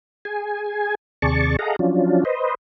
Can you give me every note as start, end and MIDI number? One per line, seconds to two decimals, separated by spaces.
0.25 0.95 68
0.25 0.95 80
1.22 1.56 39
1.22 1.56 48
1.22 1.56 68
1.22 1.56 74
1.22 1.56 81
1.22 1.56 85
1.59 1.76 68
1.59 1.76 69
1.59 1.76 75
1.59 1.76 77
1.59 1.76 78
1.59 1.76 82
1.79 2.24 53
1.79 2.24 54
1.79 2.24 61
1.79 2.24 62
1.79 2.24 65
2.25 2.55 71
2.25 2.55 72
2.25 2.55 75